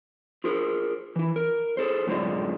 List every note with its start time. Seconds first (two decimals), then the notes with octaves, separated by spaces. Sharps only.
0.44 F4 G#4 A#4
1.16 E3 E4
1.36 A#4
1.77 G#4 A4 C5
2.07 F#2 A2 D3 G#3 F4 D5